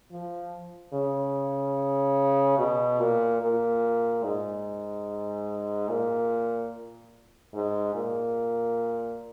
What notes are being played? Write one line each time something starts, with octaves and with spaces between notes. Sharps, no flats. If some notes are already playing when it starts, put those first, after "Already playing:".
F3
C#3
B2
A#2
A#2
G#2
A#2
G#2
A#2